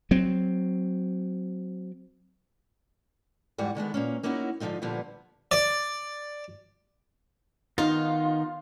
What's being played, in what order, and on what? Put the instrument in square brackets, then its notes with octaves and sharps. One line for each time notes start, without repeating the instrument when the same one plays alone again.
[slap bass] F#3 C4
[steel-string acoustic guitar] E2 G#2 G3 F#4 F#5
D3 D#3 G#3 B3
A#2 A#3 C#4
A#3 C#4 D#4 E4 F#4
G#2 D3 F3 F#3 D#4 F4
A#2 D3 F3 G3 A#3 B3
[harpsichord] D5
[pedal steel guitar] D#3 B3 [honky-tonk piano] D#4 [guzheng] F4